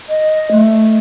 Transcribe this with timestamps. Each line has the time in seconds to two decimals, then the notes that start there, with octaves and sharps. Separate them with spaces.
0.09 D#5
0.51 A3